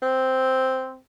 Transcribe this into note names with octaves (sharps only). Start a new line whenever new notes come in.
C4